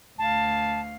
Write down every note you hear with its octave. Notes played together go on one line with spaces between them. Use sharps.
D2 F5 A5